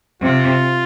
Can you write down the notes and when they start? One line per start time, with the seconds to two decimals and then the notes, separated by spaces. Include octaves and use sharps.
0.22 C3 F4